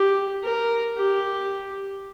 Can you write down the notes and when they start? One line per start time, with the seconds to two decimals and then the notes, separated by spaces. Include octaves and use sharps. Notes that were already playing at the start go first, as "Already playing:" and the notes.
Already playing: G4
0.44 A#4
0.98 G4